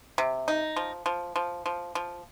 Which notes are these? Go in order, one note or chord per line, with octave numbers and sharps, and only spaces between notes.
C3
D#4
F3
F3
F3
F3
F3